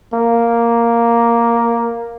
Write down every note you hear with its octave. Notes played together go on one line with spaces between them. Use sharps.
A#3